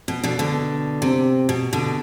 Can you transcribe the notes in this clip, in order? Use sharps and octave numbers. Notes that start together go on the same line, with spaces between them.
B2
B2 D3
B2 D3
C3
B2
B2 D3